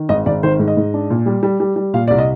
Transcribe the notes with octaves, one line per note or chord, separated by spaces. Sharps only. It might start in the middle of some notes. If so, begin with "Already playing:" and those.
Already playing: D#3
G#1 D#5
G#1 D5
D#3 C5
G#2
D#5
G#2
D4
A#2
G3
G3
G3
G3
A#2 F5
C2 D5
D#5